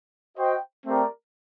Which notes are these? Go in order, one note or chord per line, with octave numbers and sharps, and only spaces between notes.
F#4 C5 D#5 G5
A3 C4 G4 A#4 D5